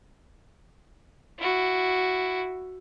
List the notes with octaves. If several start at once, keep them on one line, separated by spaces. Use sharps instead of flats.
E4 F#4